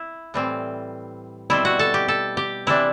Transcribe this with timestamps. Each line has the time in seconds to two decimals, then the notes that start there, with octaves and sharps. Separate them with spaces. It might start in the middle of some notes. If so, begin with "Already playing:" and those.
Already playing: E4
0.34 A2 E3 G3 C4
1.50 B2 G3 C4 E4
1.65 F#4
1.79 A4
1.94 G4
2.08 A4
2.37 G4
2.67 C3 E3 G3 D4 E4